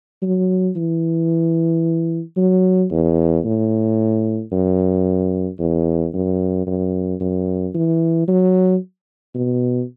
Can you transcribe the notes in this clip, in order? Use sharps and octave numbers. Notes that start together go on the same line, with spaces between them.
F#3
E3
F#3
E2
A2
F#2
E2
F#2
F#2
F#2
E3
F#3
B2